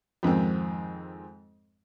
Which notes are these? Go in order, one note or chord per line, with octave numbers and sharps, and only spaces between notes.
F2 G#2 D#3 C4